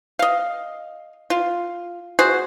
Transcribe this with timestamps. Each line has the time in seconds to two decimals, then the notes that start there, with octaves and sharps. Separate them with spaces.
0.19 D#5 F5
1.30 F4
2.19 F#4 G#4 C5